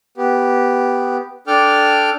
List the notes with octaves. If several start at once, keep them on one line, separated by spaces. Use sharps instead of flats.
B3 G4
D4 A4 G5 D6 F6